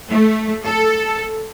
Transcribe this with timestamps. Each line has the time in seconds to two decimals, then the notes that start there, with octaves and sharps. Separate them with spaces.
0.11 A3
0.64 A4